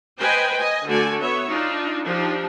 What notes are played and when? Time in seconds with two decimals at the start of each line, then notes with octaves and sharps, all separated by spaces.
0.20 B4 C5 D#5 G5 G#5
0.58 D#5 G#5
0.87 D3 A3 F#4 A4 D5 G#5
1.20 B3 C#5 E5
1.48 D4 D#4 F4
2.06 F3 D4 D#4 G4